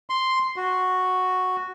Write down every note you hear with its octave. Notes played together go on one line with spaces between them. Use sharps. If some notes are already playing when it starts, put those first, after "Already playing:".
C6
F#4